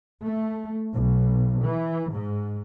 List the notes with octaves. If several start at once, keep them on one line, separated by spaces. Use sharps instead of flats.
A3
B1
E3
G#2